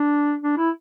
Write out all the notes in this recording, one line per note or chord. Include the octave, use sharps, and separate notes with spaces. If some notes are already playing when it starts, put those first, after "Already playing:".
Already playing: D4
D4
E4